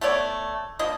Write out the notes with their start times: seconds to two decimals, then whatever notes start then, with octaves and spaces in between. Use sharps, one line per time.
0.01 A3 B3 C#5 D5
0.79 F3 A#3 D4 D#5